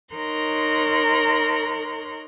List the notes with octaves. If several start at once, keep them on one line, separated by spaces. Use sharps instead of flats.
D#4 A#4 C#5 A#5 C6 F#6